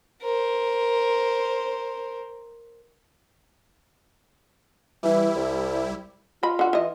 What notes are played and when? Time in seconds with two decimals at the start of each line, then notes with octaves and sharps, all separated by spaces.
0.22 A#4 C5
5.03 E3 G3 E4
5.35 C2
6.43 F4 D#5 B5
6.59 D3 F#4
6.73 E3 D#5